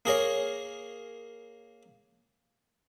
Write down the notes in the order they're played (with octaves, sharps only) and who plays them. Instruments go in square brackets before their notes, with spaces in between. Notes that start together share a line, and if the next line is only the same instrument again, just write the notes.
[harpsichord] A#3 G#4 A#4 C#5